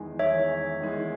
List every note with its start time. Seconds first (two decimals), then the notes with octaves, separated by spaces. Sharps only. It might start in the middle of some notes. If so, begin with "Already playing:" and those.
Already playing: E2 D#3 G#3
0.19 E2 D#3 G#3 C#5 E5
0.81 E2 D#3 G#3